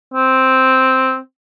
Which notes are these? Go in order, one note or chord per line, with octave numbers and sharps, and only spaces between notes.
C4